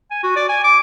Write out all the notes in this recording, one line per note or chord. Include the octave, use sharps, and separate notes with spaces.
G#5
F#4
D5
G#5
D6